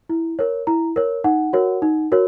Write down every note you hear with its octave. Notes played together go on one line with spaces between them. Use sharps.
E4
A#4 C#5
E4 A#5
A#4 C#5
D#4 F#5
F#4 A#4 C#5
D#4
F#4 A#4 C#5